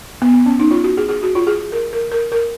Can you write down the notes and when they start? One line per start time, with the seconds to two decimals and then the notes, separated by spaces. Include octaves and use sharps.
0.22 B3
0.34 B3
0.46 C#4
0.60 D#4
0.71 F4
0.84 F#4
0.97 G#4
1.09 G#4
1.23 F#4
1.35 F4
1.47 G#4
1.72 A#4
1.93 A#4
2.12 A#4
2.32 A#4